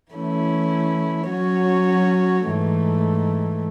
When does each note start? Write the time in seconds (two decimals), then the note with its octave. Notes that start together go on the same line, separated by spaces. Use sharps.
0.12 E3 A3 C#4 E4
1.29 F#3 C#4 F#4 C#5
2.46 G#2 E3 A3